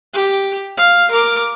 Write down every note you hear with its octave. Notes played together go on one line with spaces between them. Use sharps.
G4
F5
A#4 D6